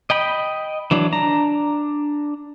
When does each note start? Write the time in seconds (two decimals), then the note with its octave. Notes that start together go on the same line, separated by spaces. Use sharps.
0.10 D#5 G5 B5
0.91 E3 F#3 D4
1.13 D4 A#5